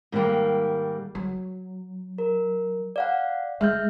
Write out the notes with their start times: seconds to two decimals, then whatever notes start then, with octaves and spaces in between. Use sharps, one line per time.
0.12 G#2 D3 D#3 G3 A#3
1.15 F#3
2.18 A#4
2.96 D5 F5 F#5
3.61 G#3 E5 F6 G6